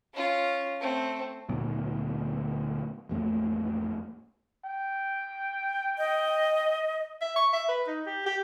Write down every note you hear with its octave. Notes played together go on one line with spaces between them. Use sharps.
C#4 F4
A3 C4
D2 A#2 F#3 B3
A1 F2 A3 A#3
G5
D#5
E5
C#6
E5
B4
D#4
G4
G4